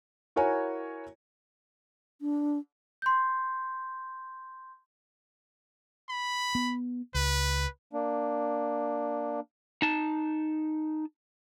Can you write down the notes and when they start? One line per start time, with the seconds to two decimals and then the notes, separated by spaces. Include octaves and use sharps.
0.36 E4 F#4 A#4 C#5 G#5
2.21 D4
3.02 C6 G6
6.09 B5
6.55 B3
7.14 C#2 B4
7.93 A#3 D4
9.82 D#4 A5